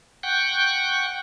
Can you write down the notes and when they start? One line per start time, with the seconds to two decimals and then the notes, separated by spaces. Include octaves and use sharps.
0.23 F#5 G5 C#6 F#6 G6